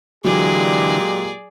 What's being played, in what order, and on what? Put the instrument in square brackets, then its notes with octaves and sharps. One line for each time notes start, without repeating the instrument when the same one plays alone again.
[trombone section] A#2 G#3 G4 [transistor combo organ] D3 E3 [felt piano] F#3 [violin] G#4 D5